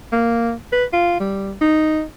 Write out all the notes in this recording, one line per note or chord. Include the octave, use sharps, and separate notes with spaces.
A#3
B4
F4
G3
D#4